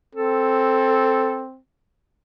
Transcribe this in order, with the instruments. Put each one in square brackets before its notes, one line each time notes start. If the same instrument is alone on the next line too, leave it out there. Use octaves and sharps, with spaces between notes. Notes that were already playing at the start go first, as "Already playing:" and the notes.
[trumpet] C4 [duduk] A4